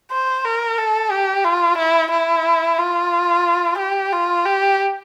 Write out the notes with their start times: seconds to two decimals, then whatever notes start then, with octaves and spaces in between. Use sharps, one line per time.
0.11 C5
0.45 A#4
0.78 A4
1.11 G4
1.44 F4
1.78 E4
2.11 E4
2.78 F4
3.78 G4
4.12 F4
4.45 G4